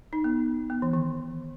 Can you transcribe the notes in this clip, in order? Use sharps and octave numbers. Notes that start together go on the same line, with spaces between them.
D#4
B3
B3
E3
D#3